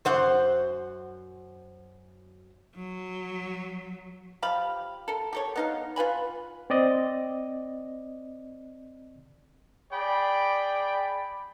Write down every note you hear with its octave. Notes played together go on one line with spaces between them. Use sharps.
F#2 C5 F#5
F#3
F3 G4 F5 B5
A4 A#4
G4 A4 C#5
B3 D#4 F5
F4 B4 G#5 B5
C4 D5 D#5
G#4 D5 G5 B5